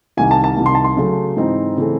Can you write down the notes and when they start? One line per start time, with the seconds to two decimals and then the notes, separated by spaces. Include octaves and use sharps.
0.17 C2 C3 D#3 G#5
0.31 A5
0.44 A5
0.57 C2 C3 D#3
0.66 C6
0.75 A5
0.84 C6
0.97 C#3 F#3 A3
1.36 G#2 E3 C4 D#4
1.77 C#3 E3 A3 C4